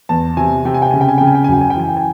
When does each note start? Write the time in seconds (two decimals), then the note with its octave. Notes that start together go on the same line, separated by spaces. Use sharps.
0.09 E2 A5
0.37 C3 G#5
0.65 C3 G5
0.74 G#5
0.82 G5
0.91 C#3 G#5
1.01 G5
1.08 G#5
1.18 C#3 G5
1.27 G#5
1.35 G5
1.44 G#5
1.48 F#2 G5
1.61 G#5
1.70 G5
1.76 E3 G#5
1.88 G5
1.97 G#5